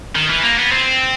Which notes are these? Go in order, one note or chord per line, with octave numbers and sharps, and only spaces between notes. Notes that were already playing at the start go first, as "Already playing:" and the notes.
D#3
E3
A#3
B3
C4